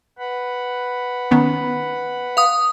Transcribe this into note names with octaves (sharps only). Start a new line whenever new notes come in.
B4 F#5 B5
D#3 B3 C#4
F5 D#6